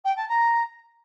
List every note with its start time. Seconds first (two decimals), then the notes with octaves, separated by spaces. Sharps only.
0.04 G5
0.16 A5
0.28 A#5